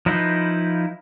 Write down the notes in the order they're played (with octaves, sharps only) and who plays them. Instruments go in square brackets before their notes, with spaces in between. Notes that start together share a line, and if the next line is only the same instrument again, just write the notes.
[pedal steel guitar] F3 D#4 E4 B4 C5